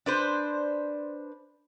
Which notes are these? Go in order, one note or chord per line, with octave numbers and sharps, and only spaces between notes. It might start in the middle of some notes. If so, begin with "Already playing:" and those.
D4 B4 C5